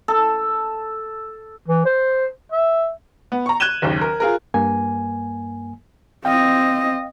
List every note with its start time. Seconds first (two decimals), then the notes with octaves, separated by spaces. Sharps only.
0.08 A4
1.68 E3
1.85 C5
2.52 E5
3.32 B3
3.46 A#5 C#6
3.60 F#6 G#6 D#7 E7 G7
3.82 F#1 D#2
4.01 A#4
4.20 F4 G#4 A#4
4.54 G2 A#3 G#5
6.25 C4 D#5 F5 G5